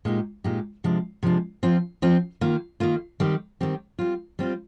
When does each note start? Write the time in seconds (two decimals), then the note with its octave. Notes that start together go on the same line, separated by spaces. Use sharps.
0.05 A#2 G#3 D#4 G4
0.44 A#2 G#3 D#4 G4
0.84 C3 F3 G#3 D4
1.23 C3 F3 G#3 D4
1.63 F3 C4 F4
2.02 F3 C4 F4
2.41 D#3 A#3 F4
2.80 D#3 A#3 F4
3.20 D#3 G3 C4 G4
3.60 D#3 G3 C4 G4
3.99 G3 C4 F4
4.39 G3 C4 F4